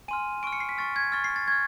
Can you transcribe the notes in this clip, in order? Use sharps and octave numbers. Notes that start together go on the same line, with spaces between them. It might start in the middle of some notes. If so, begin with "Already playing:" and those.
G#5 C6 F6 D#7
C#6 F6 D7
C#7
C7
B6
C#6 F6 A6
G#6
C#6 F6 A6
C7
A6
C#6 F6 G#6